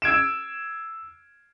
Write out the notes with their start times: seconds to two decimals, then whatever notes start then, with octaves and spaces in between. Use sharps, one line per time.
0.02 E6 G#6 D7 E7